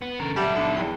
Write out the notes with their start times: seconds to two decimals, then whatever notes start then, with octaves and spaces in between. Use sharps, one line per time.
0.02 B3
0.20 D3 C#4 A4 A#4
0.36 F#3 G3 A4 D5 E5 F#5
0.55 D3 B3 D#4 E5
0.77 E2 D5 G5